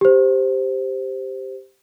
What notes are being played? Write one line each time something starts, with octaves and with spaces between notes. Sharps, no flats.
G4 C5